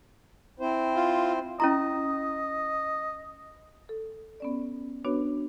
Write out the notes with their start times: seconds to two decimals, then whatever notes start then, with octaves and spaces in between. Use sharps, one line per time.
0.60 C4 E4 C5
0.96 F4
1.60 C#4 E4 D#5 A#5
3.89 A4
4.40 B3 C#4 D5
5.05 B3 D4 F#4 B4 C#5